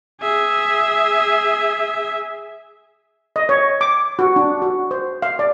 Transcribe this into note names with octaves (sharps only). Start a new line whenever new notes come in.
G#4 E5
D#5
C#5
D6
F#4
D4
F#4
C5
F5
D5